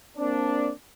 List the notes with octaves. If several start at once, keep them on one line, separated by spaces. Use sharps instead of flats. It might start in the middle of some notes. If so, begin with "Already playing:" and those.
A#3 C4 D4